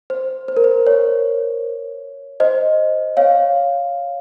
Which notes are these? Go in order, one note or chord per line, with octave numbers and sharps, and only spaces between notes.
C5
C5
A#4
C5
C#5
C5 D#5
C#5 F5